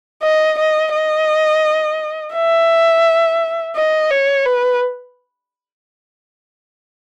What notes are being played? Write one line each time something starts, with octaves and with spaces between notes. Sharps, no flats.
D#5
D#5
D#5
E5
D#5
C#5
B4